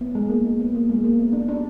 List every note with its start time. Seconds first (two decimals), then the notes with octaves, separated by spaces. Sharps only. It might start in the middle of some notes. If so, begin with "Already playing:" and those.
0.01 B3
0.15 G#3
0.30 A#3
0.60 B3
0.75 A#3
0.89 G#3
1.04 A#3
1.19 B3
1.33 D4
1.48 D4